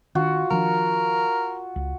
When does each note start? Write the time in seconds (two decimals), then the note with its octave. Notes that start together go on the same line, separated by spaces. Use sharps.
0.15 D#3 C#4 D4 F4 F#4
0.51 D#3 F3 D4 A#4
1.76 C#2